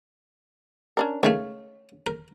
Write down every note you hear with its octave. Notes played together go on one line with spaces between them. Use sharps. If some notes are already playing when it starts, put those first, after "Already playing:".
C#4 D4 A#4
C#2 D#3 A3 C#5 F5
A#4